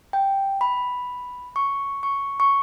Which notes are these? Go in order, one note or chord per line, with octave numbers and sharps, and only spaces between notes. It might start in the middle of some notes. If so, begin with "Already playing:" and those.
G5
B5
C#6
C#6
C#6